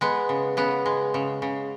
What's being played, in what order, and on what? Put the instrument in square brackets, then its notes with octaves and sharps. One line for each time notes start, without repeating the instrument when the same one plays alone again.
[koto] G#3 B3
C#3
C#3 B3
G#3
C#3
C#3